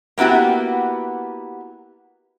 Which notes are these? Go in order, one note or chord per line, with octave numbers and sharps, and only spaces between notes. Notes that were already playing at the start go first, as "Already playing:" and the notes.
A#3 B3 E4 F#4 G4